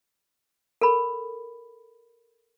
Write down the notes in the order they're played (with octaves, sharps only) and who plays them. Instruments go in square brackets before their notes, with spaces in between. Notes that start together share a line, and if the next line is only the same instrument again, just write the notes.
[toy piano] A4 A#4 B5